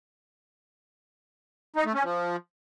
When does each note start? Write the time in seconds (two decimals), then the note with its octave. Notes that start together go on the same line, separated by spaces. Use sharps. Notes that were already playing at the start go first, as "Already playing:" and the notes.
1.76 D#4
1.85 A3
1.94 C#4
2.03 F3